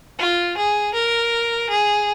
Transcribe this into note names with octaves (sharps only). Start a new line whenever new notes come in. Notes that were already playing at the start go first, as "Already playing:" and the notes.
F4
G#4
A#4
G#4